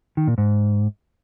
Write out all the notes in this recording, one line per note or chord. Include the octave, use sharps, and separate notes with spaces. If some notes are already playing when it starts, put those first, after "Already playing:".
D#3
A#2
G#2